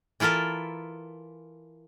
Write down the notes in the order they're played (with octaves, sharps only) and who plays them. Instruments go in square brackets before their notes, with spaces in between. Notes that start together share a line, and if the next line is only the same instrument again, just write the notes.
[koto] E3 E4 F4 A4 A#4